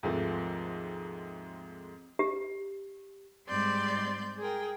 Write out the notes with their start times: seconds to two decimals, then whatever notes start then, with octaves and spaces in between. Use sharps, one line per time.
0.03 D#2 G#2 C3 F3 A3
2.19 G4
3.48 G#2 G3 C4 D5 C6 G6
4.38 G#4 A#4 G5